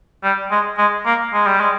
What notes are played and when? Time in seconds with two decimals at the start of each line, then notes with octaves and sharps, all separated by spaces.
0.23 G3
0.51 G#3
0.78 G#3
1.06 A#3
1.33 G#3
1.47 G3
1.60 G#3